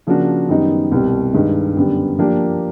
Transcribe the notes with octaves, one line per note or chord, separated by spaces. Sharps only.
C#3 F3 A#3 D4 F#4
F#2 D#3 G3 B3 D#4
C2 B2 G3
G2 D#3 G#3
F#2 D3 G3 B3
F3 A#3 D4 G4 A#4